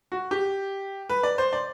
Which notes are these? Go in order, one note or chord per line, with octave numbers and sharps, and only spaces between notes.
F#4
G4
B4
D5
C5
D5